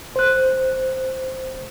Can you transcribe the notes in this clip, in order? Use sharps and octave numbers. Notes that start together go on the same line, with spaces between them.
C5 F#6